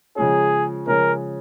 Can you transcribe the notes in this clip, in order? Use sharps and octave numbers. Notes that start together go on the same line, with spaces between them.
C#3 F3 G#3 C#4 G#4
C#3 F3 G#3 C#4 A#4